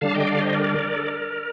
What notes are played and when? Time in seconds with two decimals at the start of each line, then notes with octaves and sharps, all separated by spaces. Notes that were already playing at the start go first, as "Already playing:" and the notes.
0.01 D3 G3 D4 F5 A5
0.14 D#5 G5
0.27 D5 F5
0.41 C5 D#5
0.54 A#4 D5
0.96 A4
1.07 A#4